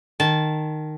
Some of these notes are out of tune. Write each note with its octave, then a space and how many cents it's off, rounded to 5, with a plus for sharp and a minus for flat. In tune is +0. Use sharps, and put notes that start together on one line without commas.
D#3 -15 A5 -15